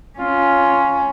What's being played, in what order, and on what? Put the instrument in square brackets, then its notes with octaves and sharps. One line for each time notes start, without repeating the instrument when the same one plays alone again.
[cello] C#4 [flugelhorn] F4